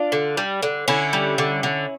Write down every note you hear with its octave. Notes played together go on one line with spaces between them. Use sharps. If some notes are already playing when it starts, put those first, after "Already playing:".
Already playing: D4 F4
D3
G3
D3
D3 C#4 E4
G3
D3
D3